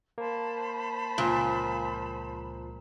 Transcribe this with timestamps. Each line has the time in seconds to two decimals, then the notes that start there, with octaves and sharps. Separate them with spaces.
0.18 A#3 C5 A5 B5
1.18 C#2 A#2 F3